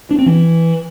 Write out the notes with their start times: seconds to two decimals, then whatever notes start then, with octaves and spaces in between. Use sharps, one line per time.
0.11 D4
0.18 C4
0.26 E3